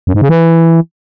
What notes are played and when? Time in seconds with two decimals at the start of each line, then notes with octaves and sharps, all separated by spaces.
0.07 F#2
0.14 G#2
0.22 C#3
0.29 E3